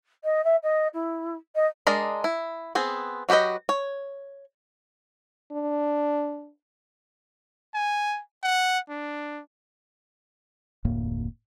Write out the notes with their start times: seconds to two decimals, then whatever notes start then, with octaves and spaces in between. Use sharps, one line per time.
0.24 D#5
0.44 E5
0.63 D#5
0.94 E4
1.55 D#5
1.87 G#3 D4 A#4 D5 D#5
2.24 E4
2.75 B3 C4 G#4
3.29 F#3 F#4 G4 B4 D#5
3.69 C#5
5.52 D4
7.74 G#5
8.43 F#5
8.89 D4
10.85 F1 D2 A2 A#3